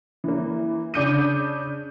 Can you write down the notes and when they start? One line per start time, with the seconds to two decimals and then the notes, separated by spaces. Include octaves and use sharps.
0.24 E3 A#3
0.94 C#3 D4 D6 G6 C#7 D#7